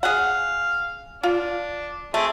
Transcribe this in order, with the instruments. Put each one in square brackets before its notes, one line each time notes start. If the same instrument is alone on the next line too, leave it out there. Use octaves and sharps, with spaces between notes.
[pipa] G#4 F#5 [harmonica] F5
[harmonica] D4 [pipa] F4
[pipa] A3 [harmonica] C4 G#4